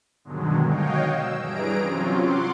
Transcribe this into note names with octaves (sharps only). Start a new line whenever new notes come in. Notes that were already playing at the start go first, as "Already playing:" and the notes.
G2 B2 D3 D#3 F#3 G#3
F#4 C#5 D#5 F5 G5
E6
G2 E3 G3 G#4 A#5 D7
C3 F#3 C4 C#4 F4
F#5 C6 D6